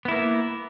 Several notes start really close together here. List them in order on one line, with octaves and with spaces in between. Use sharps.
B3 E4 A#3